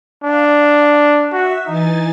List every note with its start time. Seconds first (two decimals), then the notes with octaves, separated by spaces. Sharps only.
0.23 D4 F5
1.33 F#4 E5
1.67 E3 D#4 G#5 A6